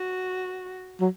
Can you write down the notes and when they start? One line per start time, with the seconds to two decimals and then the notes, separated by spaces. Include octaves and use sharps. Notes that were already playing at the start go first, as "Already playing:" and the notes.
Already playing: F#4
1.00 F#3